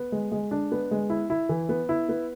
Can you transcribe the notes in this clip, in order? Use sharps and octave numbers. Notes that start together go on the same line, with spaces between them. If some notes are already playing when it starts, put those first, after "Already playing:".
Already playing: B3
G#3
G#3
D4
B3
G#3
E4
E4
E3
B3
E4
B3